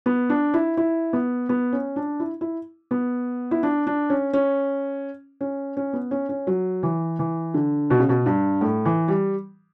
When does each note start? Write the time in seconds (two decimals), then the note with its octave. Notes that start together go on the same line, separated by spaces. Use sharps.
0.06 B3
0.30 D4
0.54 E4
0.77 E4
1.13 B3
1.49 B3
1.73 C#4
1.96 D4
2.20 E4
2.41 E4
2.91 B3
3.51 E4
3.63 D4
3.87 D4
4.10 C#4
4.33 C#4
5.41 C#4
5.77 C#4
5.93 B3
6.11 C#4
6.29 C#4
6.47 F#3
6.83 E3
7.19 E3
7.54 D3
7.90 B2
8.00 C#3
8.09 B2
8.26 G2
8.61 A2
8.85 E3
9.08 G3